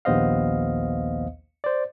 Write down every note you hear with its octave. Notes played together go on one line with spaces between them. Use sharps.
A#1 D#2 B3 C5 D#5 F5
C5 D5